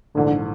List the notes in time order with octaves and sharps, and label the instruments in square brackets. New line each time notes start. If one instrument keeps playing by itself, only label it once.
[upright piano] A#1 G#2 E3 [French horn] D3